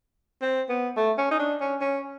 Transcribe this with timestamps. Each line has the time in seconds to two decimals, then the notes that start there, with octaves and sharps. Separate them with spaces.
0.42 C4
0.69 B3
0.96 A3
1.18 C#4
1.31 D#4
1.39 D4
1.60 C#4
1.81 C#4